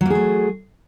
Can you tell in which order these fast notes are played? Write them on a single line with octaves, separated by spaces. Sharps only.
F#3 A#3 G#4 A3